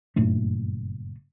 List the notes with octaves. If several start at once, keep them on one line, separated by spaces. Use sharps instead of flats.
F#1 G2 A#2 A3